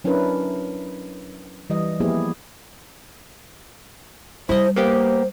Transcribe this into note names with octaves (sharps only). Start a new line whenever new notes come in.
F#3 C#4 D4 E4 A#4 B4
E3 G3 D#5
F3 A#3 B3 E4 G4 G#4
G3 E4 C5 D#5
A#3 B3 G4 C5